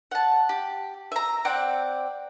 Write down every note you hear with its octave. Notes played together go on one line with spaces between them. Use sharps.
F#5 A5
G4
E5 A#5
C4 D5 F#5 G5